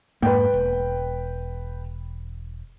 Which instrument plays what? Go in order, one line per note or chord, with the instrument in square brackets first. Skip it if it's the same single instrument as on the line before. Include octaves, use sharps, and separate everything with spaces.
[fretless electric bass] F2 G#2 A#3 [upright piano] B4 G5
[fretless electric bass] E1